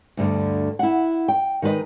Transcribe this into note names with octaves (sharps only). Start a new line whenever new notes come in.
D2 G2 D3
E4 F#5
G5
D#3 G#3 D#4 B4 D#5